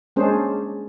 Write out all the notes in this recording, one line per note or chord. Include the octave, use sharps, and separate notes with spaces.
G#3 A#3 C#4 D4 G#4 C5